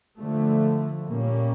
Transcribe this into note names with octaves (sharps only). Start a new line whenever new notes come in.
D3 F3 A3
A#2 G3 A#3 C#4